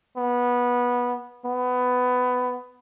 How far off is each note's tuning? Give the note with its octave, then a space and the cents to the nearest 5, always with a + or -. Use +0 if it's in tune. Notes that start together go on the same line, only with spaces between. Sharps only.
B3 -15
B3 +15